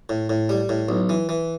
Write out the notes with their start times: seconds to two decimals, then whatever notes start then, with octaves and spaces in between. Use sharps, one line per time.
0.09 A2
0.30 A2
0.49 G3
0.69 A2
0.89 B1
1.09 E3
1.29 E3